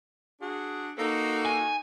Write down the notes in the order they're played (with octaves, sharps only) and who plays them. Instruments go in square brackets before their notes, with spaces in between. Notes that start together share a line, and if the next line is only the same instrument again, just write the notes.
[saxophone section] D4 F#4 G#4
[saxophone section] A#3 A4 [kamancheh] D#4 F#4
[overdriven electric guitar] G#5